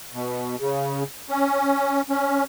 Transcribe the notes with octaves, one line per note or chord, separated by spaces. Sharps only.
B2
C#3
C#4
C#4